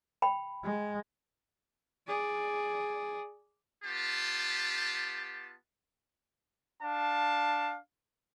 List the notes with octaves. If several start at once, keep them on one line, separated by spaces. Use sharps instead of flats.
G5 B5
G#3
G#4 D5
B3 F4 G4 A5
D4 F5 A5